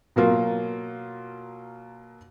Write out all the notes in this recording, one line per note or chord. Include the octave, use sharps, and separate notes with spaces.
B2 F#3 A#3 F4